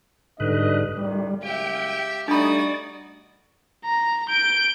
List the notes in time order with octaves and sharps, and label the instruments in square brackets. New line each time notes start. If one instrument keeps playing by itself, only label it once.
[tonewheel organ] G#2 D3 B4 [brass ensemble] G3 D4 D#5
[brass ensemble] F#1 A2 D#3 [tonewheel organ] G3
[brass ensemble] F#1 G#3 F5 [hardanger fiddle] G4 E5 [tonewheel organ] G5
[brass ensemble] G3 A3 D#4 [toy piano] D4 B5 [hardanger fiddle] F#4 D#6 [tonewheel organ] D5
[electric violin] A#5
G6 D7